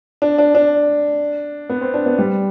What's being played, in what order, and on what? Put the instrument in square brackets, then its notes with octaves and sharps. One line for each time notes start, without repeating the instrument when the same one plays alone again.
[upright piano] D4
D4
D4
B3
C4
D4
B3
G3